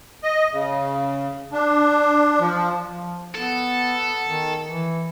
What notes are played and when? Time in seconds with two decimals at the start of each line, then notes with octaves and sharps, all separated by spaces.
0.23 D#5
0.53 C#3
1.52 D4
2.40 F3
2.82 F3
3.35 B3 A4
4.27 D#3
4.69 E3